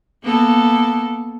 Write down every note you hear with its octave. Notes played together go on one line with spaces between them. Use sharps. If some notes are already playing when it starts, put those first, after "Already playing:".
A#3 B3 A4